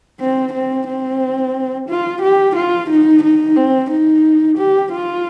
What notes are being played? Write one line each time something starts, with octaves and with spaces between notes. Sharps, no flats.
C4
C4
C4
F4
G4
F4
D#4
D#4
C4
D#4
G4
F4